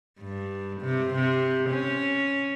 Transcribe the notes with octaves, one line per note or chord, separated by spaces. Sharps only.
G2
C3
C3
C#4